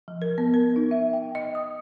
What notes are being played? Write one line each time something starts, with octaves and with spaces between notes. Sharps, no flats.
F3
A#4
B3
A#4
D#4
E5
G5
D#5
D#6